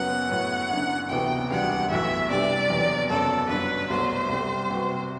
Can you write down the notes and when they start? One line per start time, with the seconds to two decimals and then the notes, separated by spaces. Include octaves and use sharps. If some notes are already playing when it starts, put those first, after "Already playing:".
Already playing: F#1 F#2 F#3 B3 F#5
0.29 A2 F#3 B3
0.70 F#1 F#2 D3
1.09 D2 C3 E3 B3 F#4 G5
1.50 E1 D2 D3 G3 B3 F#5
1.90 B1 A2 E3 B3 E5
2.30 C3 G3 D4 G4 B4 D5
2.69 F#1 E2 C3 F#3 B3
3.09 F#1 F#2 F#3 B3 A4
3.49 G1 G2 F#3 B4
3.90 C2 B2 F#3 A3 C5
4.29 C2 C3 G3
4.70 C3 G3 C4 F#4 B4